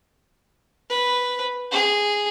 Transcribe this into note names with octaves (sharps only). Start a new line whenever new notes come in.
B4
G#4